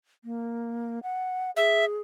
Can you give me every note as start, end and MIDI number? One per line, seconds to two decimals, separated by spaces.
0.24 0.99 58
1.03 1.51 78
1.57 2.01 68
1.57 1.85 76